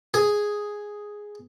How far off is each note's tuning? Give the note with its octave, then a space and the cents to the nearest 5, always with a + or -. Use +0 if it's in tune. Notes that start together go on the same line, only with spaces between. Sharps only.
G#4 +0